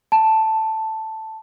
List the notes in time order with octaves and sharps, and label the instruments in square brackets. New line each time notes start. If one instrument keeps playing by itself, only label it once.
[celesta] A5